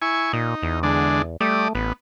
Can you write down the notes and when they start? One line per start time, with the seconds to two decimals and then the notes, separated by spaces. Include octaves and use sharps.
0.02 E4 G#5 C#6
0.33 A#2 D#4
0.63 E2
0.83 D3 G#3 D4
1.41 G3 A3 D5 D#6
1.75 A1 B3